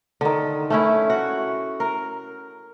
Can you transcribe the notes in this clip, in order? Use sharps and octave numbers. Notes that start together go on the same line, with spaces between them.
D3 D#3
A3 C#4 E4
F#4
A#4